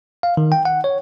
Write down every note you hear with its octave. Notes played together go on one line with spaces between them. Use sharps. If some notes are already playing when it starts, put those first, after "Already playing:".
F5
D#3
G5
F#5
C#5